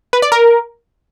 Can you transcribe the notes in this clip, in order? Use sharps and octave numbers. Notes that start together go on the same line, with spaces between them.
B4
D5
A#4